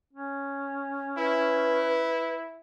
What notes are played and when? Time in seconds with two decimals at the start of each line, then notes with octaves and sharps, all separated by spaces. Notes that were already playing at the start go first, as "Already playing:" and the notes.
0.13 C#4
1.17 E4 B4